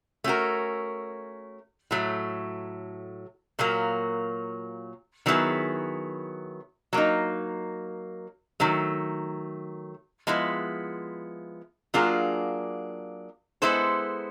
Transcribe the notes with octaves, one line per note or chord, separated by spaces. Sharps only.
A3 C#4 F#4 A#4
A2 F#3 A3
A#2 F#3 A#3
D#3 F#3 B3 E4 G#4
F#3 A#3 D#4
D#3 F#3 A3
F3 G#3 B3 E4
F#3 A#3 D4 F4 G#4
G#3 B3 E4 A4 C5